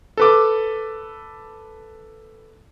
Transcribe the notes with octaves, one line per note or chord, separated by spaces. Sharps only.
A4 B4 D6